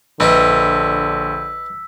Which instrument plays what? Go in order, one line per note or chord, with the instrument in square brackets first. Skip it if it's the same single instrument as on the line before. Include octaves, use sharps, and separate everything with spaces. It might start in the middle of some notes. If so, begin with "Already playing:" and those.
[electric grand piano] A#1 [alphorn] D3 [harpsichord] B4 D#5 G5 [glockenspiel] E6 B6